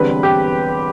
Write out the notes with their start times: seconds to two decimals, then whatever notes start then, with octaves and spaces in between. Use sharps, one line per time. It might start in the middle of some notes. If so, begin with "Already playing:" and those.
Already playing: E1 E2 D3 G3 C4 B4
0.23 G4